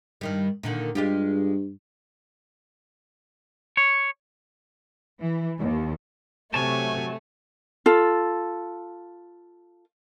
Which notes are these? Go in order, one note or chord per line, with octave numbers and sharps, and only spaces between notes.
G2 D#3 G3
A#2 D3 D#3
G2 G#3 F4 G4
C#5
E3
D#2
C3 F#3 A3 C#5 G#5 A5
F4 A4